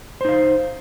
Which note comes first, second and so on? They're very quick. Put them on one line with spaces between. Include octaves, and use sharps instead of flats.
C5 D#4 F5